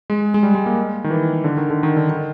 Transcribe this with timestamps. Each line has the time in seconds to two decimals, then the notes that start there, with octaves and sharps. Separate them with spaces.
0.10 G#3
0.34 G#3
0.43 G3
0.55 G#3
0.66 A#3
1.04 D#3
1.10 E3
1.44 D3
1.57 D#3
1.70 D3
1.83 D#3
1.97 D3
2.10 D#3